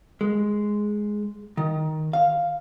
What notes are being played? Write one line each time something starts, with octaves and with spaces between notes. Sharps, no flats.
G#3
D#3
F5